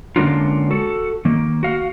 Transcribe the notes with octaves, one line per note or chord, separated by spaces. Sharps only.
D3 G#3 A#3 C#4 D4 F4
F#4 A4
D#3 A#3
F#4 F5